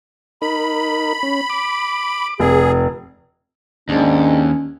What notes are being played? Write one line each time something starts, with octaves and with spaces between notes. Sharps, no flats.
D#4 A#4 B5
C#4
D6
F1 G#4
G#1 D#2 G#2 C#4 D4